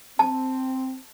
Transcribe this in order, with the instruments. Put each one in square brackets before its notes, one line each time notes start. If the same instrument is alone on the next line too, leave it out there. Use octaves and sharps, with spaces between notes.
[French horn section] C4 [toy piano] A5